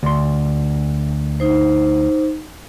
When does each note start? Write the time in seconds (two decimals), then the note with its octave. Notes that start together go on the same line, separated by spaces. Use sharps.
0.03 D2 C6
1.40 D#4 C5